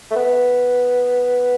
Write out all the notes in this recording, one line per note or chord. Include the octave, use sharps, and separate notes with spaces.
A3
B3